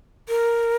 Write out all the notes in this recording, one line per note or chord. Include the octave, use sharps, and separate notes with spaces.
A#4